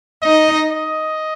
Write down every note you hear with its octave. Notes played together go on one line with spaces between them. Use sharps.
D#4 D#5
D#5